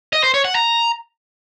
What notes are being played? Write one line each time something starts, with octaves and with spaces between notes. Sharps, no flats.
D#5
C5
C#5
F#5
A#5